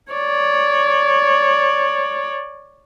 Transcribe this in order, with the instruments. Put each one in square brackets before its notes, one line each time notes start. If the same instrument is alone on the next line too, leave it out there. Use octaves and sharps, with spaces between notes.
[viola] C#5 D5